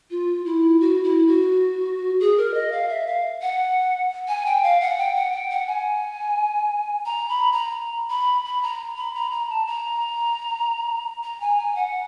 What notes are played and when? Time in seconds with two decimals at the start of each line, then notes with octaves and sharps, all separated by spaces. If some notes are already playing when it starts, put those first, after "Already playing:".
0.11 F4
0.46 E4
0.80 F#4
1.03 E4
1.27 F#4
2.20 G#4
2.38 A#4
2.54 D#5
2.72 F5
2.89 E5
3.07 F5
3.42 F#5
4.28 G#5
4.46 G5
4.63 F5
4.81 F#5
4.98 G5
5.15 F#5
5.32 G5
5.50 F#5
5.67 G#5
7.06 A#5
7.29 B5
7.53 A#5
8.10 B5
8.45 B5
8.63 A#5
8.97 B5
9.14 A#5
9.32 A#5
9.50 A5
9.66 A#5
11.23 A#5
11.40 G#5
11.58 G#5
11.76 F#5